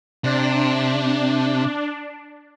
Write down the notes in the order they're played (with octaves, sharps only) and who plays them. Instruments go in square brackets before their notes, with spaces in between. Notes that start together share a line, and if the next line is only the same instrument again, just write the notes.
[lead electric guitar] C3 [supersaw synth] D4